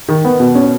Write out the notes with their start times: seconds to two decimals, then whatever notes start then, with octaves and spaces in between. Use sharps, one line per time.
0.09 D#3
0.25 B3
0.40 B2
0.55 C#4